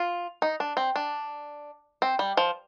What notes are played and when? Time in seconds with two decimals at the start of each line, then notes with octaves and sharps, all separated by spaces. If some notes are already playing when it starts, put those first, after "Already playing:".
Already playing: F4
0.42 D#4
0.60 D4
0.77 C4
0.96 D4
2.02 C4
2.19 G3
2.37 F3